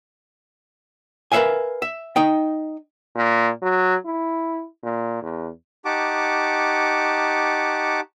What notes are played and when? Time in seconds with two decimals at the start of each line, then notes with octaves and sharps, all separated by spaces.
1.32 A#4 B4 C#5 E5 F5 G#5
1.82 E5
2.16 D#4 D#5 G5
3.15 A#2
3.62 F#3
4.06 E4
4.83 A#2
5.22 E2
5.85 D#4 G4 F#5 A5 C#6 D6